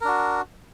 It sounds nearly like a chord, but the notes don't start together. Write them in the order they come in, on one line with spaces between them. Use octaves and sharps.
A#4 D4 F#4